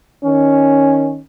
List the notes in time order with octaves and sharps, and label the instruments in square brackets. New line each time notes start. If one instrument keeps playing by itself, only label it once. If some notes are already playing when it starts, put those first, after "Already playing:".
[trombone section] D#3 C#4